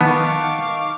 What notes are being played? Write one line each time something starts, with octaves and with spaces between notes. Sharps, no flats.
D#3 B3 F5 A5 C#6 D6